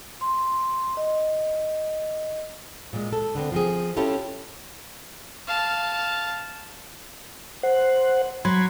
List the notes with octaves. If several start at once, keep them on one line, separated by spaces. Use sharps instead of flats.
C6
D#5
A#2 G#3
A4
D3 B3 C4
F3 C4 G#4
C#4 E4 F4 G4 A4
F5 A5
C5 F#5
F#3 B5 C6 G#6